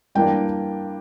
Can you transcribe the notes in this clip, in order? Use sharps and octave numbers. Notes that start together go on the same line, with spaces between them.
G2 E3 A#3 D4 G5